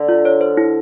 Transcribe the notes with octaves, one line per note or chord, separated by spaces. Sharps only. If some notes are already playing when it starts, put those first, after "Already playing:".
Already playing: D3
F4
C#5
C5
E4